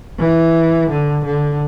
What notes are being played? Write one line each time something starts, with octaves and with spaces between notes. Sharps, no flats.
E3
D3
D3